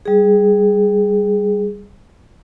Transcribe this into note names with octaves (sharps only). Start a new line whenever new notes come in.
G3 G#4